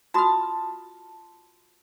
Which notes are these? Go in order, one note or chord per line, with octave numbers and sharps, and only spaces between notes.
F4 F#4 A5 D#6 F6